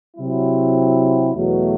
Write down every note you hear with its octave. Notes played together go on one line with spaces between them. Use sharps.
C3 F#3 C4 E4
E2 B2 F#3 A3